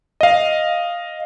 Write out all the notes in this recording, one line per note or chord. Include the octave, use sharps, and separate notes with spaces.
D#5 F5